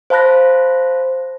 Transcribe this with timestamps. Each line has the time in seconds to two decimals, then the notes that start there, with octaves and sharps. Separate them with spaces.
0.10 C5 F5 A5 B5 F#6 A#6